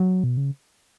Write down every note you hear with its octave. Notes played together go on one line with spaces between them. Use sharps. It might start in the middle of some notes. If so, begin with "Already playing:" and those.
Already playing: F#3
B2
C#3